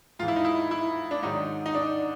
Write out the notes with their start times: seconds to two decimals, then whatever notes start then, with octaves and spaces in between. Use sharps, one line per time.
0.19 G#2 E3 F4
0.28 E4
0.36 D#4
0.45 E4
0.71 E4
1.11 D4
1.22 G#2 D#3 F#3 D#4
1.66 D#4
1.75 D4